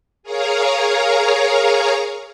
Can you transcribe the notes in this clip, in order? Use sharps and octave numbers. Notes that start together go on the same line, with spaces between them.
G#4 A#4 C#5 F5 A#5